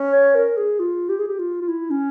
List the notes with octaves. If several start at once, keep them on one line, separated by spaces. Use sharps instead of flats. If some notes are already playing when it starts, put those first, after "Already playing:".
Already playing: C#4
C#5
A#4
G#4
F4
G4
G#4
G4
F4
F4
E4
C#4